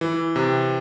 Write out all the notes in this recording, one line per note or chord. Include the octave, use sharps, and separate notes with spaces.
E3
C3